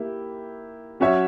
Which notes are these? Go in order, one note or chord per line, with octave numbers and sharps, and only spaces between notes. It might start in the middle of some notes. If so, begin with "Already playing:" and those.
Already playing: A#3 E4 G4
F#3 C#4 F#4 C#5 E5